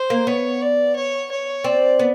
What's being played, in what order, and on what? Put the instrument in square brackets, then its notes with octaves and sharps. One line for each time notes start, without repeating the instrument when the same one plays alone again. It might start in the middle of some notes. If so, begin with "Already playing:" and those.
Already playing: [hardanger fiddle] C5
[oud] A#3
[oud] B3 [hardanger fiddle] C#5
[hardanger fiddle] D5
C#5
C#5
[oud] C4 [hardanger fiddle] D5
[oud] B3